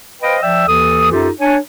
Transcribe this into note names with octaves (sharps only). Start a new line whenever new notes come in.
B4 C5 D#5 F5 G5
F3 D5 E5 G5 E6
D#2 E3 A4 D#6
F#2 D#4 F4 G4 A4
D4 C#5 G#5